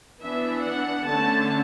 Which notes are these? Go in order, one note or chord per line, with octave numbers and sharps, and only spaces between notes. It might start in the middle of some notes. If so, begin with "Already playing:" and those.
E3 B3 D4 E5
F#5
D3 A3 C#4 A5